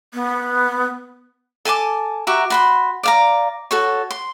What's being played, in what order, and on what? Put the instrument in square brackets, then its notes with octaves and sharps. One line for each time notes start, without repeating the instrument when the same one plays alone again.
[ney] B3
[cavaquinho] A4 G#5 A5 D6
F#4 G4 E5 A#5
F#4 B5 C6
D5 F5 A#5
F#4 A4 C#5
C6